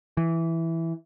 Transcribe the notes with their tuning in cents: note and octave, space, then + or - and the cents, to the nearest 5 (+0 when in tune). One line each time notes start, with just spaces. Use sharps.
E3 +0